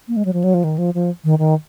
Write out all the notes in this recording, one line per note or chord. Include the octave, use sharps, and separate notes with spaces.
A#3
G#3
F#3
F3
F#3
F3
D#3
F3
F3
D#3
D#3